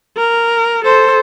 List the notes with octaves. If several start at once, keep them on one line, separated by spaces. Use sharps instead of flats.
A#4
A4 C5